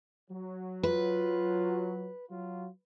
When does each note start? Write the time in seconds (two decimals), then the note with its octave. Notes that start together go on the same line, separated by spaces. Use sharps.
0.31 F#3
0.83 F4 B4
2.30 F#3 F4